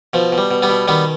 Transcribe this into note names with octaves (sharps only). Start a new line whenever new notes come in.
B2 F3
B2
G3
B2
G3 B3
B2
D#3 G3 B3